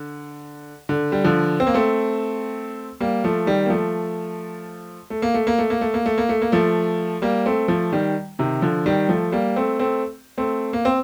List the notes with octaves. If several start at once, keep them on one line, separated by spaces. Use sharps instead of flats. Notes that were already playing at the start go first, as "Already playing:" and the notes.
Already playing: D3
D3
G3
D3 F3
C4
A#3
A3 C4
G3 A#3
F3 A3
D#3 G3
A#3
F3 A3
A3
A#3
A3
A#3
A3
A#3
A3
A#3
A3
A#3
A3
A#3
F3 A3
G3 A#3
A3 C4
F3 A3
D#3 G3
C3 D#3
D3 F3
D#3 G3
F3 A3
G3 A#3
A3 C4
A3 C4
A3 C4
A#3
C4